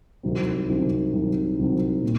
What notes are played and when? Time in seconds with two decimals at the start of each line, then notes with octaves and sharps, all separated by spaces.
0.23 C2 C3 D#3 F#3 C4
0.69 C2 C3 D#3 F#3 C4
1.13 C2 C3 D#3 F#3 C4
1.59 C2 C3 D#3 F#3 C4
2.03 A#2